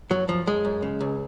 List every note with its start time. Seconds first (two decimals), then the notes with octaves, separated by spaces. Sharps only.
0.10 F#2 F#3
0.28 F#2 F3
0.47 F#2 G#3
0.65 F#2
0.82 C#3
1.01 C#2